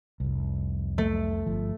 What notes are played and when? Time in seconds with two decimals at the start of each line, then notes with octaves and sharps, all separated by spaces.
0.20 F1 C2
0.98 A3
1.46 G1 F3